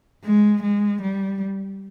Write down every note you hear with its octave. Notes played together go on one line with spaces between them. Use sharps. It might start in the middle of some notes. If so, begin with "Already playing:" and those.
G#3
G#3
G3